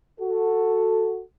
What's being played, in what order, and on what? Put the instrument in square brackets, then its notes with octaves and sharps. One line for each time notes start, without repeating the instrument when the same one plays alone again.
[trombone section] F#4 A4